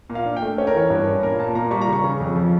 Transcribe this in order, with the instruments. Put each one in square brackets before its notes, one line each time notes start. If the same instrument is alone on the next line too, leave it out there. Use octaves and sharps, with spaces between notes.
[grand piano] A#2
F5
D4
G5
A3
C#4 C#5
A#4
E3 C#5
G2
C#4
A#2 A#4
A#2 A5
A#2 A#5
G3 C#6
A#5
C#3
C#6
C#3
F2
F3